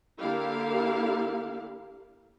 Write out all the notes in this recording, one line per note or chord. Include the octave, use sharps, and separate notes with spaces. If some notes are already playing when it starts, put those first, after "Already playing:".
D3 A#3 E4 G4 F5